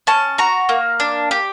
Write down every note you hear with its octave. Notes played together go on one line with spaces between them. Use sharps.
C#4 A5
F#4 A#5
A#3
D4
G4